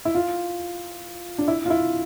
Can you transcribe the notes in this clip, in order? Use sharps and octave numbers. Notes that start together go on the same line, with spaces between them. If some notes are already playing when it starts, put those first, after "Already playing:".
E4
F4
D4
E4
F4
E4